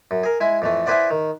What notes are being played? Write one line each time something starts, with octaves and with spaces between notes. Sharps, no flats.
F#2
G#4 A#4
G#3 E4 G#5
F2 E3 A3
E4 G#4 B4 C5 D5 F#5
D#3